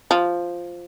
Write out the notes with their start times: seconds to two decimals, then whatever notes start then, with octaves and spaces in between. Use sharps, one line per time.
0.11 F3